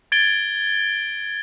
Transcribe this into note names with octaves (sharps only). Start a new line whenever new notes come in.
G#6 A6 D7 G7